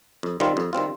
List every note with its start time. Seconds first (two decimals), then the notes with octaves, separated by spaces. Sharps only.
0.23 F2
0.40 D#3 G3 C4 F4
0.57 F2
0.73 D#3 G3 C4 F4